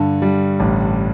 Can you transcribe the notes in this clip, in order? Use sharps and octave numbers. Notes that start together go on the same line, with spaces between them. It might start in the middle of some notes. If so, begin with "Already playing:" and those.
Already playing: G2 D3
G3
A1